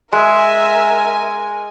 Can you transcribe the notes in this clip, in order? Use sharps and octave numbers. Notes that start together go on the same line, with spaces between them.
G#3 A#4 E5 G#5